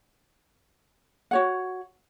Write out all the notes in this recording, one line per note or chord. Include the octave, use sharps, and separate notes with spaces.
F#4 C#5 F#5